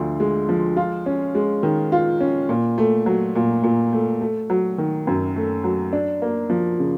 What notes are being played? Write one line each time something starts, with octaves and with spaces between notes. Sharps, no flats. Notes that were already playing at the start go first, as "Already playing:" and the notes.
Already playing: D2 D3 F3
G#3
F3
F4
C#4
G#3
D#3
F4
C#4
A#2
A3
F#3
A#2
A#2
A3
A3
F#3
D#3
F#2
A3
F#3
D4
A#3
F3
C#3